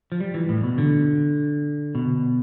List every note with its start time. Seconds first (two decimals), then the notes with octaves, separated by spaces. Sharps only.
0.12 F3
0.20 G3
0.34 E3
0.49 A2
0.63 B2
0.78 D3
1.95 B2